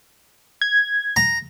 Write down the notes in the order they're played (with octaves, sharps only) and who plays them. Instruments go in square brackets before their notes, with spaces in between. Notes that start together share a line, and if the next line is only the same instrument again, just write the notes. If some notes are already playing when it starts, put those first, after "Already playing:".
[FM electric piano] G#6
[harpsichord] A#5